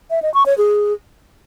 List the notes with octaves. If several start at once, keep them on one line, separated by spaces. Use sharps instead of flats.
E5
D#5
C#6
C#5
G#4